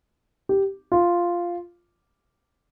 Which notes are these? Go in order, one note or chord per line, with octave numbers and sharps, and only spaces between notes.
G4
F4